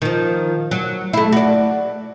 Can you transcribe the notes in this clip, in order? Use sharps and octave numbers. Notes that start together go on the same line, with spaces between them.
D#3 F3
F#3
A3 E4
F#4 D5